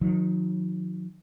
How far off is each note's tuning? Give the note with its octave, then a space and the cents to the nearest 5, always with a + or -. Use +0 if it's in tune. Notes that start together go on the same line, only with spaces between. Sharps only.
D#3 +0 F#3 -40